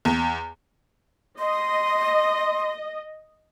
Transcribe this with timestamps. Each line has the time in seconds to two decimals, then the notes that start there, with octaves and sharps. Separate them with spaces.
0.05 E2
1.39 D#5 C6